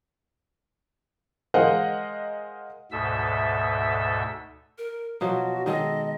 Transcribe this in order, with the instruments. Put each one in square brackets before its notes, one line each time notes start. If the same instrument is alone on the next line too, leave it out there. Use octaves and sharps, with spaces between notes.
[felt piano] G#3 A#4 C5 D#5 F5 F#5
[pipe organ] D2 G#2 B2 A4 E5 E6
[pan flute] A#4
[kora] B2 F3 F#3 [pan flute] F#4
[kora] D#3 G#3 A4 [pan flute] D#5